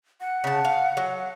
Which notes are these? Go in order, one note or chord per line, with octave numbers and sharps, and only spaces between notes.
F#5
C#3 A5
F5
F#3